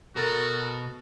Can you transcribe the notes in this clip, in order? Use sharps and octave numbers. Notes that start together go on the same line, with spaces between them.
B2 F#4 A4 A#4 A6